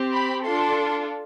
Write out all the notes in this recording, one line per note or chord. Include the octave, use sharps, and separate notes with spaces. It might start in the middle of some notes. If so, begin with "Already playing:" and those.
Already playing: C4 G4
B5
D4 F4 A4 C6